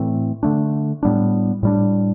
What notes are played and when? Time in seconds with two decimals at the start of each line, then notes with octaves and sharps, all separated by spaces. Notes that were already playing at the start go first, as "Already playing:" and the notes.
Already playing: A2 E3 A3 C4
0.43 D3 A3 D4
1.03 A2 G3 B3 D4
1.63 A2 G3 D4